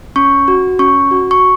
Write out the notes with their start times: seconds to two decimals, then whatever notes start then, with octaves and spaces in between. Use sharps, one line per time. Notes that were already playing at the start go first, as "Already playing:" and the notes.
0.16 C#4 C#6
0.48 F#4
0.79 C#4 C#6
1.11 F#4
1.31 C#6